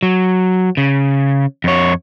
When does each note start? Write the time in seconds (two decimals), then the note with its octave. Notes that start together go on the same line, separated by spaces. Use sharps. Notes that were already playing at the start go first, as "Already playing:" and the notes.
0.03 F#3
0.77 C#3
1.64 F2 C#5